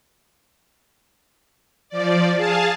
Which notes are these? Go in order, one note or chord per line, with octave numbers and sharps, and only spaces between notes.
F3 D5
G#4 F5 A5